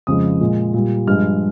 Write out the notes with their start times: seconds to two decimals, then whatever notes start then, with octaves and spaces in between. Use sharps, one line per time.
0.07 F2 C#3 F3 G#3 D#6
0.41 A#2 G#3
0.74 A#2 G3
1.08 G2 F3 G#3 F6